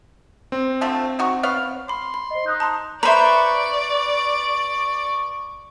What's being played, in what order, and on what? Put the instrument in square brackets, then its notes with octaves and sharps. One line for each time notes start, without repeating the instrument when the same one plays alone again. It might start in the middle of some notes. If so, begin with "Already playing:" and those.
[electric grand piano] C4
[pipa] D3 F3 A3
D#4 F#4 C#6
B3 C#5 F5
[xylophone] B5 D6 [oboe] C6
[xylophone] B5
[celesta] C5 D#5
[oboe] D#4 [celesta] D#6 F#6 G6
[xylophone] A5 A#5 C6
[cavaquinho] B4 C5 [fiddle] D5 [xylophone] E5 A#5 [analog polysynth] C#6